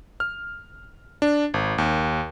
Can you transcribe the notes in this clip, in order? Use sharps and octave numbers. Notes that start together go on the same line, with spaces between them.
F6
D4
G#1
D#2